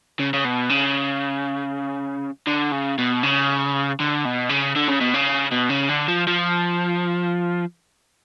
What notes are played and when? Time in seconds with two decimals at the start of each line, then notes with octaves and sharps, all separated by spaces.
0.19 C#3
0.33 C#3
0.45 B2
0.70 C#3
2.47 D3
2.72 C#3
2.98 B2
3.23 C#3
4.00 D3
4.25 B2
4.49 C#3
4.76 D3
4.88 C#3
5.01 B2
5.14 C#3
5.52 B2
5.70 C#3
5.89 D3
6.08 F3
6.27 F3